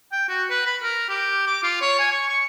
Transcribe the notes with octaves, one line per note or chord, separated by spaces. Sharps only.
G5
F#4
B4
B5
A#4
G4
D6
F4
C#5
G#5
C#6
C#6